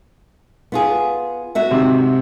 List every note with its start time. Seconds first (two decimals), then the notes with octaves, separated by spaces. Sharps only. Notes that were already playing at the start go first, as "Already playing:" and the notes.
0.72 B3 F4 G#4
1.55 F#4 E5 F#5
1.71 G#2 C3 C4